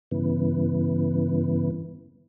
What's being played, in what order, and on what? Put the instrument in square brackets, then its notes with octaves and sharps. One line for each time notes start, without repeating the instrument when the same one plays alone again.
[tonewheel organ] G2 C#3 E3 B3